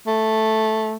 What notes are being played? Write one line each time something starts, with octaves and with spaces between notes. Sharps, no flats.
A3